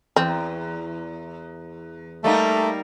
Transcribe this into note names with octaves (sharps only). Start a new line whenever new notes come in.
E2 C4
G3 A3 A#3 D#4